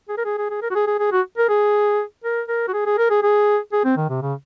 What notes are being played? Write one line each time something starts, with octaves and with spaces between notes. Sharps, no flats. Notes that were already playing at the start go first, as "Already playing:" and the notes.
G#4
A#4
G#4
G#4
G#4
A#4
F#4
G#4
G#4
G#4
F#4
A#4
G#4
A#4
A#4
F#4
G#4
G#4
A#4
G#4
G#4
G#4
C4
D#3
C3
C#3